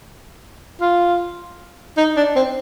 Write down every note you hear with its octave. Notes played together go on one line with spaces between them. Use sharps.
F4
D#4
D4
C4